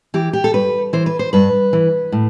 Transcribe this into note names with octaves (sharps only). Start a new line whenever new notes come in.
E3 G4
G4
A4
G2 B4
E3 C5
B4
C5
G2 B4
E3
A2